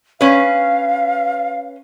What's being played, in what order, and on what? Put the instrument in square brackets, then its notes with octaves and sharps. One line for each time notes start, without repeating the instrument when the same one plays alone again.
[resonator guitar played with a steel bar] C#4 B4 [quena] F5